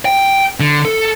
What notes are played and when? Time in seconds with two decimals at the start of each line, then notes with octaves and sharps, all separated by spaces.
0.05 G5
0.60 D3
0.85 A4